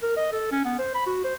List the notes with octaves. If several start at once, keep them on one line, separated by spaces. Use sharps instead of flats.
A#4
D#5
A4
C#4
B3
C5
B5
F#4
C5